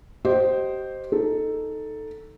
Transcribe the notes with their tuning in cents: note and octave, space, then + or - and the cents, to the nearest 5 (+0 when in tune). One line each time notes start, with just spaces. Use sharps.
G4 -30 C5 +0 D#5 +0
D#4 +0 A4 +0